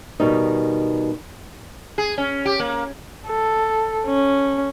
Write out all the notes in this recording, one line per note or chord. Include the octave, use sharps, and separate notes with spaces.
B2 D#3 G3 D#4
G#4
C#4
G4
A#3
A4
C#4